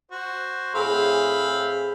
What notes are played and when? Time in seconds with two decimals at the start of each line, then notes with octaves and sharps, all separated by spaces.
0.11 F#4 C5
0.75 A2 C4 G#4 F5 B5